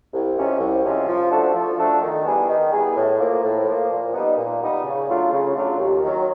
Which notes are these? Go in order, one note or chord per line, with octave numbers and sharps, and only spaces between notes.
C2
C3 F3 G#3 C#4
C2
C3 F3 G#3 C#4
F3
A3 D4 F#4 A4
F3
A3 D4 F#4 A4
D#3
G3 B3 E4 G#4
D#3
G3 B3 E4 G#4
A2
F3 A#3
A2
F3 A#3
A#2
G3 B3 D#4
A#2
G3 B3 D#4
C#3
F#3 A3 D4 F4
C#3
F#3 A3 D4 F4
D#2
D#3 F#3